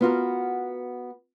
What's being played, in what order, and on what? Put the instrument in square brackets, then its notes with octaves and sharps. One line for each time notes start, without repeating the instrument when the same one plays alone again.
[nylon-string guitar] B3 F4 F#4 A#4